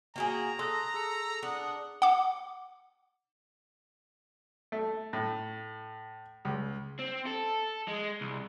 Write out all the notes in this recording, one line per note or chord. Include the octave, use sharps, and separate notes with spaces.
A#3 F#4 G#4 G5 A#5
A4 C6 D#6 F#6 A#6
G#4 E6 C#7
D4 F#5 D#6
F#5 D6
A3
A2
C#2
C4
A4
G#3
C2